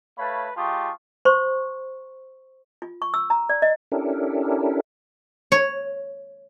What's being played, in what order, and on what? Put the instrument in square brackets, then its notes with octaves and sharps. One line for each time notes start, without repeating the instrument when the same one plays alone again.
[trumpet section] A3 B4 C#5 F5 A5 B5
G#3 F4 G4 A5 C#6 D#6
[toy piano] C5 C6 C#6
F4
C#6
E6
A#5
D5
D#5
[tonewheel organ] C#4 D4 E4 G4 A4 A#4
[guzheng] C#5